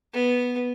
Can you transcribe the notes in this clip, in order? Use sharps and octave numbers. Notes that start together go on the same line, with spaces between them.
B3